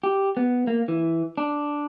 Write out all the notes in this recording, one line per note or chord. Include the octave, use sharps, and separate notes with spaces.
G4
B3
A#3
E3
D4